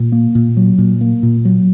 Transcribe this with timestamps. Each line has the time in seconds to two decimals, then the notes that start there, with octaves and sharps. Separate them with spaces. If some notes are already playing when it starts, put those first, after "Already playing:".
Already playing: A#2
0.12 A#3
0.35 A#2
0.57 F#3
0.78 A#2
1.01 A#3
1.23 A#2
1.45 F#3